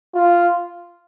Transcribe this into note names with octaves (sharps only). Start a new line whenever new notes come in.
F4